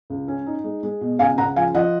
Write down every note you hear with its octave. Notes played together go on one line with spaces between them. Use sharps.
C#2
C#4
D#4
G#3
G#3
B2
C#2 F5 G#5
C#3 F#5 A#5
F3 F5 G#5
F3 D#5 F#5